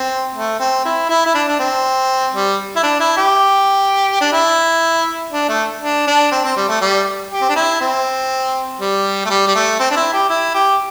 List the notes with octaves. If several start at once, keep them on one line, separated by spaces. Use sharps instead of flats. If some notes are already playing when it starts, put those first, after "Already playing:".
Already playing: C4
A3
C4
E4
E4
E4
D4
D4
C4
G3
E4
D4
E4
G4
D4
E4
D4
A3
D4
D4
C4
C4
G3
A3
G3
G4
C4
D4
E4
C4
G3
A3
G3
G3
A3
C4
D4
E4
G4
E4
G4